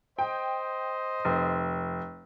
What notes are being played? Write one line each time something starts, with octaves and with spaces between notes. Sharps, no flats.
C5 D#5 G5
F1